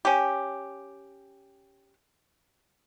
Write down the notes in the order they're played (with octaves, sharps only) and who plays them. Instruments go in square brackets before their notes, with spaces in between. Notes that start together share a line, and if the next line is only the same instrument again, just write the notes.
[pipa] C#4 G4